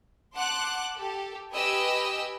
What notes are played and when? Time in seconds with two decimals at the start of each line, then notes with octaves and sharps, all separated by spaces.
0.35 F#5 A5 C6 D6 F#6
0.95 G4 A4
1.52 G4 B4 D#5 G5 G#5 E6